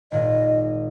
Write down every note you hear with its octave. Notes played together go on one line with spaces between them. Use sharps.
G#1 A#2 D#5